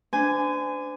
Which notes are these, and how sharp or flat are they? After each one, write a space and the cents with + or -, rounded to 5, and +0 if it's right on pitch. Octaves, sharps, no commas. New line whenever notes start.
D4 +0 C5 -40 G#5 +0